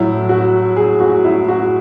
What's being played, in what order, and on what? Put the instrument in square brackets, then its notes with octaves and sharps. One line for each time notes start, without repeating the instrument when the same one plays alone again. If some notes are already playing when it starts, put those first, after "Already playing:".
Already playing: [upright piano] A2 F#3 E4
F#4
G#4
F#4
E4
F#4